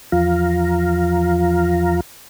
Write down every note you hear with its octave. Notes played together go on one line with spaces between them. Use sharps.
E2 F3 F4 F5 A#5